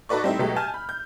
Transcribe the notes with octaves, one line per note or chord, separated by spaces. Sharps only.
D#4 F#4 A4 B4 D5 C#6
G3 A3 C4 D#4 E4
B2 F#3 G#3 A3 G4
G#5 A5 F6 G6
B5
G6